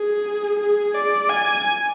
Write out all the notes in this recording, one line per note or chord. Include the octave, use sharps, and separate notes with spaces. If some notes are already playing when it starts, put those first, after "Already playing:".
Already playing: G#4
G#4
D5
G#5